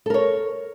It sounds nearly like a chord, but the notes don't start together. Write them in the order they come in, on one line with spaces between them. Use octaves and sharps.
A4 A#4 C#5